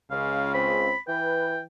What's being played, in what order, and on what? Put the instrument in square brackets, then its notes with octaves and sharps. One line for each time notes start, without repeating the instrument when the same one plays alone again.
[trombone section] C#2 C#3 [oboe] F5
[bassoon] C4 [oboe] B5
[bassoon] E3 [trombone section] B4 [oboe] G5